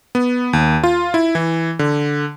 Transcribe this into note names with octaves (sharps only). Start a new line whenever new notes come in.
B3
D#2
F4
E4
E3
D3